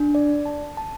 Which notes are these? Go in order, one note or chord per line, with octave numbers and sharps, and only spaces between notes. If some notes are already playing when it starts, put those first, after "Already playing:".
Already playing: D4
D5
A5
A5